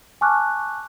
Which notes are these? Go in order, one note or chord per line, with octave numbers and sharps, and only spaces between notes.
G#5 A5 C#6 D6 F6 F#6